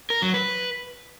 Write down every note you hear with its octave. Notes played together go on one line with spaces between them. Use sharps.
A#4
F#3
B4